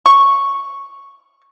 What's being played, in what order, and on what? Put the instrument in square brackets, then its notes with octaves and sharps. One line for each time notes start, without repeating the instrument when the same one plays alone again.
[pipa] C#6